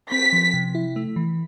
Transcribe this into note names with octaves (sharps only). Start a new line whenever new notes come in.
C4 B6
F3
C3
E4
A3
E3